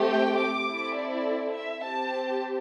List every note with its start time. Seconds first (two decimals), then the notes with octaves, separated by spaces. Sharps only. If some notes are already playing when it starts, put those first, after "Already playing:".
Already playing: A3 C4 G4
0.09 G5
0.38 D6
0.68 C4 E4 A4
0.96 D5
1.54 E5
1.83 C4 G4 A5